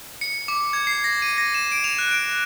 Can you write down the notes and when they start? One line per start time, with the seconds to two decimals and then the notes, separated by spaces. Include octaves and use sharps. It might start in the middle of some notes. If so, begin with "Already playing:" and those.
0.21 C#7
0.48 D6
0.73 G#6
0.87 C7
1.04 A#6
1.22 D#7
1.38 A#6
1.54 E7
1.72 D7
1.84 F7
1.98 F#6
2.11 D7